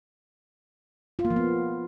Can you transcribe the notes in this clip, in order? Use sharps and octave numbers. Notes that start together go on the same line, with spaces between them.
F4
A#3
F3
B3